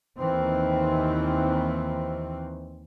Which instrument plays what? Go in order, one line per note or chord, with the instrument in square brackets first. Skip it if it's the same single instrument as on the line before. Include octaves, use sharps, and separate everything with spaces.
[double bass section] D#2 D#3 E3 C4